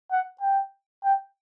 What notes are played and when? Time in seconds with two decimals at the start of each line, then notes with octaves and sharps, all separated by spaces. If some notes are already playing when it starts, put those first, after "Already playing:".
0.11 F#5
0.41 G5
1.04 G5